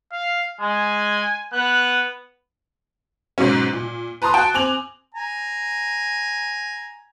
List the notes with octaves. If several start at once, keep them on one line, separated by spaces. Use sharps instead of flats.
F5
G#3 G#5
B3 F#6
G#2 B2 F#3 C#4
A#2
B4 A5 A#5 C6 D#6
F#4 G5 A5 F#6
C4 G#5 D6 F7 F#7
G#5 A#5